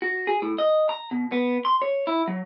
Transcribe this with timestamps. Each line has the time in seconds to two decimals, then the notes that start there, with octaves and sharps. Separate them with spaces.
0.02 F#4
0.27 G#4
0.42 A2
0.58 D#5
0.89 A#5
1.11 B2
1.32 B3
1.65 C6
1.82 C#5
2.07 E4
2.28 F#3